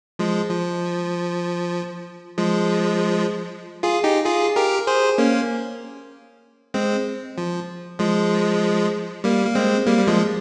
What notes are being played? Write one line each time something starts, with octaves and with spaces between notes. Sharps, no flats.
F3 G#3
F3
F3 G#3
F4 G#4
D#4 G4
F4 G#4
G4 A#4
G#4 C5
A#3 C#4
G#3 C4
F3
F3 G#3
G3 A#3
A#3
G#3 C4
G3 A#3
G3
F3 G#3